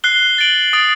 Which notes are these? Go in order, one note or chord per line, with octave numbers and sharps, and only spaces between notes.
F#6 C7 G7
A6 D7 F#7
D#6 A6 D7